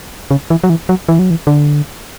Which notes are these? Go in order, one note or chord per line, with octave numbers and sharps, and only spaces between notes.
C#3
E3
F#3
E3
F#3
E3
F#3
E3
D3